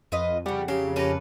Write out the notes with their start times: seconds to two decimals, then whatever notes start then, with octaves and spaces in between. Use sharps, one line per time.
0.12 F2 F4 B4 D#5
0.46 C#3 G3 F#5
0.68 C#3 F#3 G4 F5
0.96 A#3 C#4 G4 A4 B4 A#5